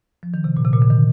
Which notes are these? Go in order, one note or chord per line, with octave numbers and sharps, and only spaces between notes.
F3
D#3
C3
A#2
C3
A#2
D3
D#3